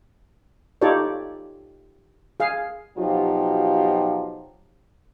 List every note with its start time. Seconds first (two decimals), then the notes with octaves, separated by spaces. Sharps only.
0.81 D#4 F4 G4 A4 C#5 D5
2.40 G#4 F5
2.98 B2 F3 F#3 D#4 F4 G4